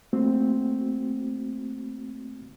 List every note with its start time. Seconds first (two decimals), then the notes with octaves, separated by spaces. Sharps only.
0.13 A3 A#3 C4 F#4